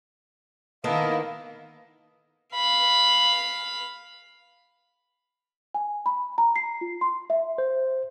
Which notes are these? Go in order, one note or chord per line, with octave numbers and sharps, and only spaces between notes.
D#3 A#3 B3 E4 A4 A#4 D#5 F5
F5 B5
G#5
B5
A#5
C7
F4
C6
E5
C5